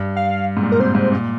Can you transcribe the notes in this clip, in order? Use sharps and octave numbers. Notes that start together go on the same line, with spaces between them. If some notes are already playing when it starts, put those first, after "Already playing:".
Already playing: G2
F5
G#2
A#2
A#4
C3 C5
G#2
A#2